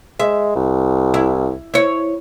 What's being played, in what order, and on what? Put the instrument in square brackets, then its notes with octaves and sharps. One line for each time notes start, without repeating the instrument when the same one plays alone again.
[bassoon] G#3 [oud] E5
[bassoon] C2
[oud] E4
E4 C#5